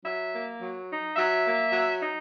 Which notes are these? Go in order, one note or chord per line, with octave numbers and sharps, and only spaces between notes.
F#3 E5
A#3
F#3
D#4
F#3 E5
A#3
F#3
D#4